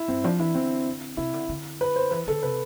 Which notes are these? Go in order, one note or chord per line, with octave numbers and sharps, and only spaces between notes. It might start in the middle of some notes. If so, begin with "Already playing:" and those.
Already playing: E4
G2 C4
F3 D4
E3 E4
D3 C4
C3 E4
D3
D3
B4
C5
E3 B4
D3 A4
C3 B4